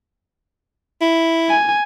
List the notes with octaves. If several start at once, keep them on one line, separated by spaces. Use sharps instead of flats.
E4
G#5